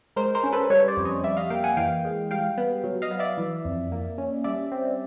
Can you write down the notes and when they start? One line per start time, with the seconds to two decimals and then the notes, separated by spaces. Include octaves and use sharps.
0.16 G#3 A#4 C5
0.35 A#4 C5
0.44 C#4
0.53 A4 B4
0.70 G3 B4 C#5
0.88 C5 D5
0.97 F2
1.05 C#5 D#5
1.23 G3 D5 E5
1.37 D#5 F5
1.50 A#3 F5 G5
1.64 F#5 G#5
1.77 E3 F5 G5
2.04 G#3
2.31 G3 F5 G5
2.58 B3
2.84 F#3
3.02 D#5 F5
3.11 B3
3.19 D5 E5
3.38 E3
3.65 F2
3.92 A#3
4.18 C#4
4.44 G3 D5 E5
4.72 C4